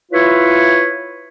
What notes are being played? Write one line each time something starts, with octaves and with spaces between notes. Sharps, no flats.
E4 F4 B4 C#5